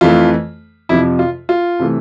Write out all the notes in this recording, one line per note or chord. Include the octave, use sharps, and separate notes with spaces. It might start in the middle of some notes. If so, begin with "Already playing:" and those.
F2 E3 A3 F4
F2 C3 F3 E4
F4
F4
C3 E3 A3